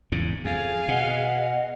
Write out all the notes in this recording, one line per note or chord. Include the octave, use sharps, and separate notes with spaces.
E2 G#2 C#3
F2 G#4 F5
B2 D#5 F#5